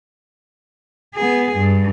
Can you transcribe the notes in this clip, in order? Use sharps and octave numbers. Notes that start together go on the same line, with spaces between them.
B3 G#4
G2